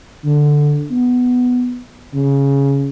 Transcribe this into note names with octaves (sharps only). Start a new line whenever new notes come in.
D3
B3
C#3